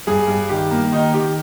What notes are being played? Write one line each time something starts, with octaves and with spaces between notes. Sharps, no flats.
G2 G#4
G2
D#3 G4
A#3
D#3 D#4
D#3 G4